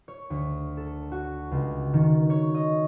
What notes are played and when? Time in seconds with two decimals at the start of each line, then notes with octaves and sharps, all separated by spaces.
0.08 C#5
0.30 D2
0.77 A4
1.12 F#4
1.51 C#2
1.94 D#3
2.30 C#5
2.55 D#5